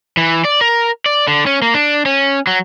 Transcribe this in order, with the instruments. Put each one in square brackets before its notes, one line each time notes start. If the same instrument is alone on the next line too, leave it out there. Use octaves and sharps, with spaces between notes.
[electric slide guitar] E3
D5
A#4
D5
D3
C#4
A#3
D4
C#4
F#3